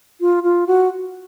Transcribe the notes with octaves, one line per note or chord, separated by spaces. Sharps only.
F4
F4
F#4